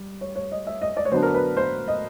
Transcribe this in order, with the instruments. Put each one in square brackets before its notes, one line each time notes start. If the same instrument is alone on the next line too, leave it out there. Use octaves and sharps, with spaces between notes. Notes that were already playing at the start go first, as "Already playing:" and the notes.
Already playing: [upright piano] G3
C#5
C#5
D#5
E5
D#5
D5
C#5
D3 F#3 B3 D4 C5
A#4
B4
C5
D#5